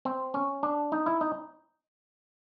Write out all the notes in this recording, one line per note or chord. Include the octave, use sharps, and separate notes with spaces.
C4
C#4
D4
D#4
E4
D#4